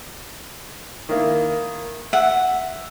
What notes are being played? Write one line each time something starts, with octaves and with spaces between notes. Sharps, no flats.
D#3 A#3 E4
E5 F#5